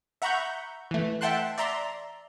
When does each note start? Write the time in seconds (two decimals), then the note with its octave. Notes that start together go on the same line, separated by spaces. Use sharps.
0.22 E5 F#5 A#5 B5 C#6 G6
0.91 E3 A3
1.21 E5 F#5 G5 A5 C6 F#6
1.58 D5 E5 A#5 C6